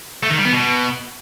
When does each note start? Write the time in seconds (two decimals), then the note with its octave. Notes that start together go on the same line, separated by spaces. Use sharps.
0.23 A3
0.30 D#3
0.38 G3
0.45 B3
0.52 B2